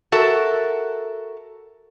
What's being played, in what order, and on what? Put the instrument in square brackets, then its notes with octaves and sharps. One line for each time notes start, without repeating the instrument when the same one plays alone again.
[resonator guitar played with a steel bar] F#4 A4 A#4 E5